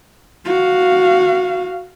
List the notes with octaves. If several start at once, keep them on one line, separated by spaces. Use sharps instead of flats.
F#4 F5